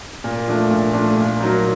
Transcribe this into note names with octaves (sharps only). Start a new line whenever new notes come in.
A#2
F3 A3 D4
A#2
F3 A3 D4
A#2
F#3 A#3 D#4